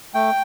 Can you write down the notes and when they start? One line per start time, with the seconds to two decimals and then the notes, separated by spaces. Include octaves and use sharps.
0.14 A3 G5